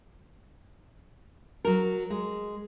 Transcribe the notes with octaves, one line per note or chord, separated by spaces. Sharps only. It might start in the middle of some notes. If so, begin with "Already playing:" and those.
F#3 A#4
G#3